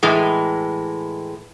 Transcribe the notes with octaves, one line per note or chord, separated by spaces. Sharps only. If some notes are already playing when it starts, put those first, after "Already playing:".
A2 E3 G#3